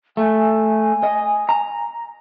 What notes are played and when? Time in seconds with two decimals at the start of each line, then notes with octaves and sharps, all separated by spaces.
0.17 A3 G#5
1.03 D#5
1.49 A#5